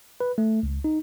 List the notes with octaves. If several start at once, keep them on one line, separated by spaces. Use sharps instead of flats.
B4
A3
C#2
D#4